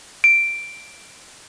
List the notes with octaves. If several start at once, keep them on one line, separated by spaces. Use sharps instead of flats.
D7